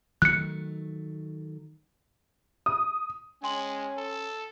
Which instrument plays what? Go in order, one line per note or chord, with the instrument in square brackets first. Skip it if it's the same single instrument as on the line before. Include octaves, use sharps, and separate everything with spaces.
[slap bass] D#3 F#3 A3 [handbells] F#6 C#7
[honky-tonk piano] D#6
[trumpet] G#3 [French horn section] C#4 [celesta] G5 C6 F#7 [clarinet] G#5
[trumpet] A4